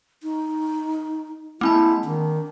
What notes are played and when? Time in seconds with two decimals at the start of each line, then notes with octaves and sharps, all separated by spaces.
0.23 D#4
1.61 G#3 A#3 C4 E4 A5
2.04 D#3 D4